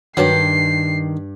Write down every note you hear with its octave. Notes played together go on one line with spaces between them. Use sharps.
G2 D#3 F#3 G4 B4 A5 C7